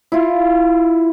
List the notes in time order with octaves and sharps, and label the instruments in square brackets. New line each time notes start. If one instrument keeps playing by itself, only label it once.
[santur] E4 F4